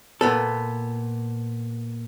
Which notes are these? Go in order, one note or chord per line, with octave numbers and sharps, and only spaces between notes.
A#2 B3 A4